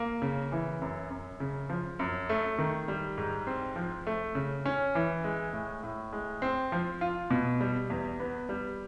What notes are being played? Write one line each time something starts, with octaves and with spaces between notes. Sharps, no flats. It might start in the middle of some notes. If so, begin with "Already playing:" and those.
Already playing: A#3
C#3
E3
F#2
F#2
C#3
F3
F#2
A3
D#3
G3
G#2
C4
F3
A3
C#3
C#4
E3
G#3
A2
A2
G#3
C4
F3
F4
B2
G3
E2
B3
G3